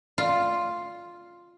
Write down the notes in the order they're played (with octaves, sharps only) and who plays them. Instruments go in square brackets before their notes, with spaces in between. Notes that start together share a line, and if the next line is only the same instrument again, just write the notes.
[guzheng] F4